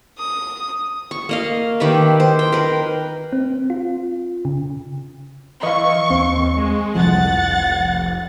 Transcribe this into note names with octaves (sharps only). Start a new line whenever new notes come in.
D#6
C#6
A#3 D#5 F5
D#3 G4 B4 E5
C5
G5
A#4 B4
C4
F4
C#3
E3 D#5 F5 C#6
D#2 C4
G#3
G1 C2 F2 F3 F#5 A6
F1